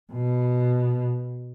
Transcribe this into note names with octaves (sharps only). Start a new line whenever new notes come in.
B2